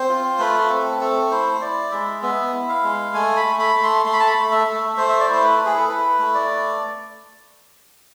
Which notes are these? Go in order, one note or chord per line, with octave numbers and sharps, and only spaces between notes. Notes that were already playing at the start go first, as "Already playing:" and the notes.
Already playing: C4 C5
F4
A3 B4
C4 A4
A3 A4
E4 C5
E4 D5
G#3 E5
B3 E5
E4
F5
G#3
A3 G#5
B5
A3
B5
A3
C6
A3 C6
B5
A5
B5
A3
E5
A3
A3 C5
E5
D5
E4 C5
B4
E4
G#4
A4
E4 B4
A3
D5